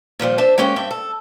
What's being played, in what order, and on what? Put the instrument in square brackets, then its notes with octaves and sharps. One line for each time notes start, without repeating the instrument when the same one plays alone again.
[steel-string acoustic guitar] A#2 D#3 F3 G3
D4 C5 E5 A5
G#3 A#3 C#4 G4 F5 G5
G2 C4 E5 G5
A4